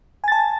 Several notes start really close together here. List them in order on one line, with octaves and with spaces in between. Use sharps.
G#5 A6 A5